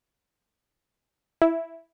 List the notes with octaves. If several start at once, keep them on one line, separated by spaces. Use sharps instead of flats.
E4